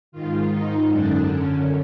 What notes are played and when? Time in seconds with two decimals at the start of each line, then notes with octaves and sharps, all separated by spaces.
0.12 G#2 D#3 F4
0.50 D#4
0.89 F#2 D3 D4
1.27 C#4